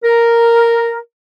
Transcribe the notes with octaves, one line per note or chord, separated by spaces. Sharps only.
A#4